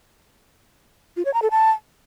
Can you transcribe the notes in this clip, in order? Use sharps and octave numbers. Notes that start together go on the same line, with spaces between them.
F4
C#5
A#5
A4
A5